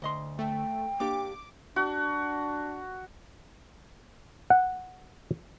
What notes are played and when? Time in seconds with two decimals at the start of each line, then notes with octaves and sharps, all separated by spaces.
0.02 D2 D#5 C6
0.39 A3 G5
1.00 A#3 D4 G4 D6
1.76 D4 F#4
4.50 F#5